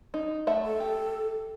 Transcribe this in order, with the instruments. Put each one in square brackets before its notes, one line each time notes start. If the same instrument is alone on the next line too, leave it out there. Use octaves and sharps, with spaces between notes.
[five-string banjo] D#4
A3 E5 F#5
[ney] A4
[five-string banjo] G4